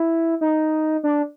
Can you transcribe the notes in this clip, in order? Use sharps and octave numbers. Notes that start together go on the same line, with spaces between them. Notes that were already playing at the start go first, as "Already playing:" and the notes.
Already playing: E4
D#4
D4